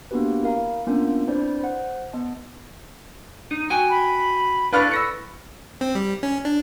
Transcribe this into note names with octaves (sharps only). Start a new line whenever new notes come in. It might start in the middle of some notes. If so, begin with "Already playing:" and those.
A#3 B3 D4 F#4 G4 B4
E4 A#4 F5 A#5
A#3 B3 C#4 D4 F4 A#4
C4 D4 E4 B4 C5 D5
C5 F#5
B3 D#5 A5
D#4
F#4 G5 G#5
B5
D4 E4 A4 B4 F5 C#6 F6
C#6 E6 A#6 C#7
C4
G3
C#4
D4